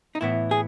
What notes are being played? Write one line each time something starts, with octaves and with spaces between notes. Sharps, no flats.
D#4
A2 E3 B3 E4
G#4